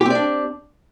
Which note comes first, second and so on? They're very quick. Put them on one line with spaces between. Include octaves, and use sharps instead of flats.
G4 C4 D5 D4